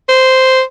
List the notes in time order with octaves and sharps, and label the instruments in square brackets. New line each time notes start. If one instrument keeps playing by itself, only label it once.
[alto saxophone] C5